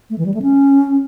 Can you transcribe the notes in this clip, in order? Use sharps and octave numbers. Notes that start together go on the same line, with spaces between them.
A3
E3
G3
A3
C#4